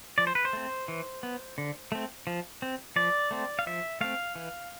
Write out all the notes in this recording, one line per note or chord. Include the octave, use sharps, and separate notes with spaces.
F3 D5
C5
B4
C5
A3 C4
E3
B3
D3
A3 C4
F3
C4
F3 D5
A3 C4
F5
F3 E5
A3 C4 F5
E3